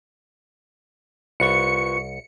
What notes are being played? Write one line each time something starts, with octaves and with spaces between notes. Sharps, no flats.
C2 F4 B4 C#6 C#7